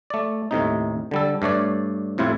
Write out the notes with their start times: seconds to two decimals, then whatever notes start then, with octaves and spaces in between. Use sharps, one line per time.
0.10 A3 D5
0.51 D#2 A2 C3 D#4
1.11 D3 G3 A4
1.42 G2 A3 C#5 D5
2.18 F2 A2 C3 E4 F4